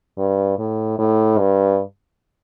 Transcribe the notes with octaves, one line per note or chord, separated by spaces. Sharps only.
G2
A2
A2
G2